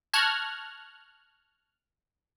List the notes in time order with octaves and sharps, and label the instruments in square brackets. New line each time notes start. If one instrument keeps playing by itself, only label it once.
[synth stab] A5 C#6 F6 F#6 G#6 A#6